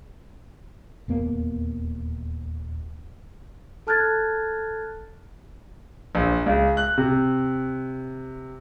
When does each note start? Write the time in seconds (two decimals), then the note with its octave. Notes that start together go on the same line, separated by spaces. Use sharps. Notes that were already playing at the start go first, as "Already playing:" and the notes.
1.08 D#1 E2 A#3 B3
3.87 A4 A5 F6 F#6 G#6 A6
6.15 A#1
6.46 C#2
6.77 F#6
6.98 C3